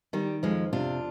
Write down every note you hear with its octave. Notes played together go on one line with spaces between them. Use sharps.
D#3 G3
F2 F3 G#3
C3 D4 F4